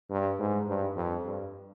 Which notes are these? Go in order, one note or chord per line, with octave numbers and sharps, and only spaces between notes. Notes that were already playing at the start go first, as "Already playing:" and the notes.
G2
G#2
G2
F2
G2